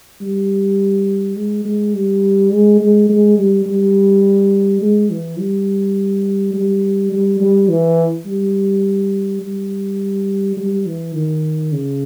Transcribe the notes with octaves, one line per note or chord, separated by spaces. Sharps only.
G3
G#3
G#3
G3
G#3
G#3
G#3
G3
G3
G#3
E3
G3
G3
G3
G3
E3
G3
G3
G3
E3
D#3
C#3